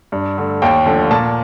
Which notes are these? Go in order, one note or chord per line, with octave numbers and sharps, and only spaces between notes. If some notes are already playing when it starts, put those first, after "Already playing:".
G2
D3 A3
D#2 G5
D3 F3 A3
A#2 A5